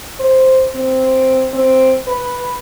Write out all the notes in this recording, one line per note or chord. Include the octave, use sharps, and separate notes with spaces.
C5
C4
C4
B4